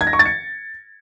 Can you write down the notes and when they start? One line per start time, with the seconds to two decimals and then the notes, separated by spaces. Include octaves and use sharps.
0.01 G#6
0.07 A#6
0.13 C#6
0.19 A6
0.26 C#7